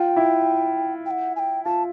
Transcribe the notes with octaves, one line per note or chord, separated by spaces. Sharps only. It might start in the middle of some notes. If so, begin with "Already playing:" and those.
Already playing: F4 G5
E4
G5
F#5
G#5
G5
F4 A5